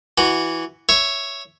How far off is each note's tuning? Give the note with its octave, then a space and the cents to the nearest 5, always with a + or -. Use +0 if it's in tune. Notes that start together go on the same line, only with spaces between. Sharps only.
E3 +0 F#4 +0
C#5 +0 E5 +0